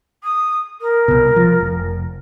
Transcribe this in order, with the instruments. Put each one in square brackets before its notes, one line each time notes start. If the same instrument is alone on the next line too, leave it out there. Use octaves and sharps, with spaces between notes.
[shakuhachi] D#6
A#4
[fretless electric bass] C2 B2
F3
F1